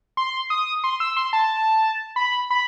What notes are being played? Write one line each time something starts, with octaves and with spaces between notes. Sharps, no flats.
C6
D#6
C6
E6
C6
A5
B5
B5